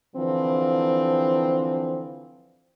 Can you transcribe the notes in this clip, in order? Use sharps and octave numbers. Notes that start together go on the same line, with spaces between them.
D3 E3 F3 C4